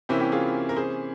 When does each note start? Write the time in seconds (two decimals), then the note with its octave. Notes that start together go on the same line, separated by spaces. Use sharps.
0.09 C3 E3 A#3 C4 C#4 E4
0.20 E4 G4
0.32 F4 G#4
0.69 A#4
0.76 G#4 C5